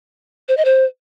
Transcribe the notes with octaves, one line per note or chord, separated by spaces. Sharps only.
C5
D#5
C5